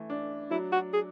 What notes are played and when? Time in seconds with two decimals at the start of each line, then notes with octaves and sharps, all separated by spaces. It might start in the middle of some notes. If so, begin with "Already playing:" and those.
Already playing: E3 A3
0.10 D4
0.51 F#3 E4
0.72 F#4
0.93 G#4